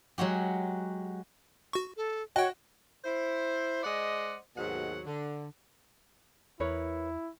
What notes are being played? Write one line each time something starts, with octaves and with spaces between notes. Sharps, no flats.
F#3 G#3 F#4 G4
F#4 C#6
A4
F#4 C#5 D#5 G5
E4 C5
G#3 C5 D5 D#5 F#5
D#2 G#2 B2 F#3 F#5
D3
E2 E4 A#4 B4 C#5